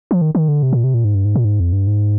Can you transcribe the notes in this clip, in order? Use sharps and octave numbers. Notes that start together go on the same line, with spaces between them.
F3
D#3
D#3
D3
C3
A#2
C3
A#2
G#2
G2
G#2
A#2
G#2
F2
G2
G#2